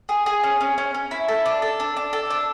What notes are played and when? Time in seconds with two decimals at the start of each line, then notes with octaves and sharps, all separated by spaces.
0.09 G#4
0.26 G#4
0.43 C#4
0.61 C#4
0.78 C#4
0.94 C#4
1.11 E4
1.28 A4
1.46 D4
1.62 A4
1.80 D4
1.97 D4
2.13 A4
2.30 D4